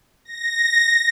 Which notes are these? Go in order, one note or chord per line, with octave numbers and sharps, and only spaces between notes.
A#6